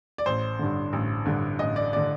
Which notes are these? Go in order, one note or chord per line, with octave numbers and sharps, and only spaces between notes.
D5
A1 C5
G2 D3
A1
G2 D3
A1 D#5
D5
D5
D3